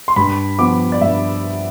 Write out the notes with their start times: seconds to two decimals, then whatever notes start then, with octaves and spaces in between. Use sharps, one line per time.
0.08 C6
0.16 G2 B5
0.59 F3 B3 D6
0.92 D5
1.01 G2 E5